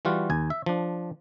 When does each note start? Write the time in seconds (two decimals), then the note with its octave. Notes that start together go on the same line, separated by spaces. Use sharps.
0.05 E3 G3 F4 F#4
0.30 D#2 G#5
0.50 E5
0.66 F3 D4